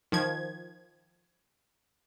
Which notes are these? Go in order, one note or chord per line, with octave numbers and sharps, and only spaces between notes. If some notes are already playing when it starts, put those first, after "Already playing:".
D#3 F3 G#6